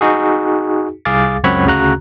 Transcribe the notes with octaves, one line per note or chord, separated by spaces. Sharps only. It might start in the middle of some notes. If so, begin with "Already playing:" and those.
D#4 F#4 G#4
C2 G#4 F5 D6 A6
C#2 F#2 C4 C#5 F#5 B5
D2 C#3 F#4 A#5 F#6